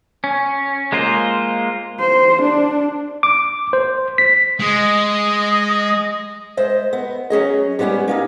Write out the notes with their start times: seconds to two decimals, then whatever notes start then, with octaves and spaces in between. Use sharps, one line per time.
0.24 C#4
0.92 G#3 A#3 F4 C5
2.00 C5
2.42 D4
3.23 D6
3.73 C5
4.18 B6
4.60 G#3 D#5
6.57 G#3 C5 D#5 E5
6.93 B3
7.30 F#3 C#4 G#4 D#5
7.79 G3 G#3 B3 C#4 G4
8.08 A#3 C#4 D#4